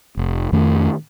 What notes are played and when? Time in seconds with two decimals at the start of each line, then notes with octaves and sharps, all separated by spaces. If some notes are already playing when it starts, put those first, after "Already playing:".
0.17 F1
0.52 F2 D#3 A3